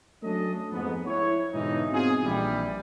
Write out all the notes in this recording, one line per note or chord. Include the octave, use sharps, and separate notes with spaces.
F#3 A3 C#4 D4 A4 D#5
F2 G#2 B3
E4 C#5
G#2 B2 D3 E3 D#4
B3 C4 D#4 F4 F#4 G#4
A#1 E3 G3